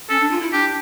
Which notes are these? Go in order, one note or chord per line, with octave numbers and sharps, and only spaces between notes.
C#4 A4
D4
F4
E4
D4 G4